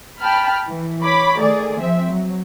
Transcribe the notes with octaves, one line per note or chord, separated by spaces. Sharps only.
G5 A5 B5 F6
E3
C#5 B5 D6
D#3 A3 G#4 D5
F3 C4 E5
F#3